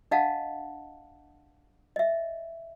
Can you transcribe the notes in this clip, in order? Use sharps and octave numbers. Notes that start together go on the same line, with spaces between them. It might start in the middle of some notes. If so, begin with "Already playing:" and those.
D4 D#5 F5 F#5 A5
D#5 E5